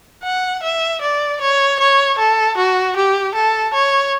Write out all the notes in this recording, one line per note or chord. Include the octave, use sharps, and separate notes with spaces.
F#5
E5
D5
C#5
C#5
A4
F#4
G4
A4
C#5